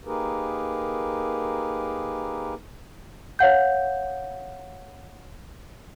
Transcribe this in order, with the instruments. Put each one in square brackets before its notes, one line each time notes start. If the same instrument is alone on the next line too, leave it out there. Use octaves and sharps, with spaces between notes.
[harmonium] A#3 D#4 G4 G#4 A#4 B4
[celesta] C#5 F5 F#5 G6